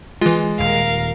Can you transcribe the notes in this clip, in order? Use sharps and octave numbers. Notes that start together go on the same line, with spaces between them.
E3 G#3 F4
D#1 A#4 F5